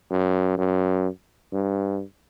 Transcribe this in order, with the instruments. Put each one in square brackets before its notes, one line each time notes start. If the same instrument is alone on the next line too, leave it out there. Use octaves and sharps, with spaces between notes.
[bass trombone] F#2
F#2
G2